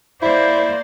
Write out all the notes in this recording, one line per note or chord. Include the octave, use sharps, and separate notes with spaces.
A#3 E4 C5 D5